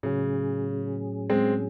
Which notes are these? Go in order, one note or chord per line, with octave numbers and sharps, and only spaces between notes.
A2 C#3 F#3 C#4 G#4
G#3 C4